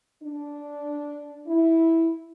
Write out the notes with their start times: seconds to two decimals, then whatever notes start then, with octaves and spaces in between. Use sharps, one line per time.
0.23 D4
1.47 E4